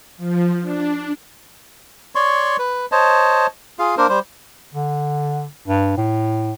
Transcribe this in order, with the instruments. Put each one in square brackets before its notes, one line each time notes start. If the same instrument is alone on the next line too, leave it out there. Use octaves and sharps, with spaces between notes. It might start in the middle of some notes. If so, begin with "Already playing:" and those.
[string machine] F3
D4
[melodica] C#5 D5 C6 C#6
B4
C5 C#5 D#5 A5
F4 G#4 F5
A#3 D4 A#4 C5
G3 C5
[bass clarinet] D3
G2
A2